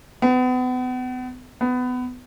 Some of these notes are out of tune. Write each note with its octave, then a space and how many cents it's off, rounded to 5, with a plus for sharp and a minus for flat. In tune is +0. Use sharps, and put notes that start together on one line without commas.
B3 +35
B3 +20